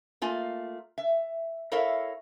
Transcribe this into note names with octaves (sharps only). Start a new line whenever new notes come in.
A3 A#3 F4 G#5
E5
E4 A4 A#4 C#5 E5 F5